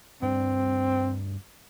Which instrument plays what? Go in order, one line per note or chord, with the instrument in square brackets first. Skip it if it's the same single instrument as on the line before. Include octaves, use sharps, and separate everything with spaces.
[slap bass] D2 G2 D4 [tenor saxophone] C4